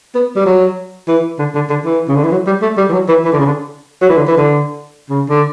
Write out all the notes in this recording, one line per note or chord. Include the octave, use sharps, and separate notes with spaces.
B3
G3
F#3
E3
D3
D3
D3
E3
C#3
D3
E3
F#3
G3
A3
G3
E3
F#3
E3
E3
D3
C#3
D3
F#3
E3
D3
E3
D3
C#3
D3